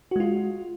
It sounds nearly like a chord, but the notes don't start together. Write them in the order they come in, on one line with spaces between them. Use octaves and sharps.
F#4 G#3 F4